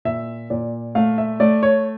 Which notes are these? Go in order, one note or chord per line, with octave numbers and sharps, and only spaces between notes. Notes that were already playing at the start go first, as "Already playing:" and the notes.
A#2 E5
A#2 D5
A3 F5
E5
A3 D5
C#5